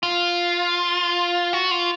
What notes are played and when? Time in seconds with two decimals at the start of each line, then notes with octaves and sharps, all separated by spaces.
0.03 F4
1.53 F#4
1.71 F4